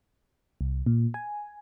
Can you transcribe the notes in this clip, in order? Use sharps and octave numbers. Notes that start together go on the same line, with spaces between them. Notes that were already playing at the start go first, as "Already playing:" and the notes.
C2
A#2
G#5